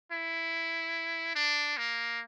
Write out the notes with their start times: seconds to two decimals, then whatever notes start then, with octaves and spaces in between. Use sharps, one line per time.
0.12 E4
1.35 D4
1.78 A#3